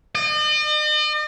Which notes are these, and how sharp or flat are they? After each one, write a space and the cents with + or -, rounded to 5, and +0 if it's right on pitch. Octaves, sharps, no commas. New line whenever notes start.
D#5 -45